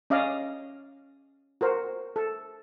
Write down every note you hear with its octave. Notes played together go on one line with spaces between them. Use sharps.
C#4 D5 D#5 F5
F#4 A#4 C5
A4